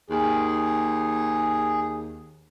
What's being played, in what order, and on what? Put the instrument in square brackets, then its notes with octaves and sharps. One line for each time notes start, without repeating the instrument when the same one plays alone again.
[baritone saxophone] D#2 [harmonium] G#4